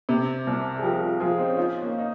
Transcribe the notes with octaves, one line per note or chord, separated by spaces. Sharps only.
C3
C2
G#4
F3 G4 A#4
F4 G#4
F3 F4 G#4
C4 D#4
C#4
C4 D#4 F4
A#3 C#4
D#4